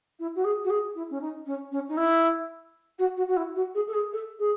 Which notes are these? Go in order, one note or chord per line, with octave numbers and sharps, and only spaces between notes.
E4
F#4
G#4
F#4
G#4
E4
C#4
D#4
C#4
C#4
D#4
E4
F#4
F#4
F#4
E4
F#4
G#4
A4
G#4
A4
G#4